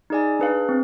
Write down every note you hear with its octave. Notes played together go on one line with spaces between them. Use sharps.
D#4 G#4 D5 G#5
D4 G#4 B4 F5
C4